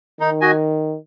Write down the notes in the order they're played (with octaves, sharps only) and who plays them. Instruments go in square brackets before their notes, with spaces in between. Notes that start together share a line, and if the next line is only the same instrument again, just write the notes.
[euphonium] D#3 [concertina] D#4
[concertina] F#4 D#5 G#5